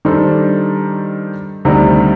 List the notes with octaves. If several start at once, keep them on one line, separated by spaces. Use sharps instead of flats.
D#3 G3 D4 A4 C5
D2 C3 D#3 G3